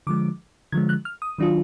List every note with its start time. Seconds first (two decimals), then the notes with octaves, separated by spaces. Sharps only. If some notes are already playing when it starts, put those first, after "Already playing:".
0.07 D3 F3 G#3 D6
0.72 D3 F3 G#3 G#6
0.89 F#6
1.05 F6
1.22 D#6
1.38 D#3 F#3 D4 F4